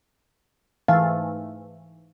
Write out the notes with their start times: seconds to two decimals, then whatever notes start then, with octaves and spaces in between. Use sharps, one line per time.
0.88 G#2 E3 A3 F5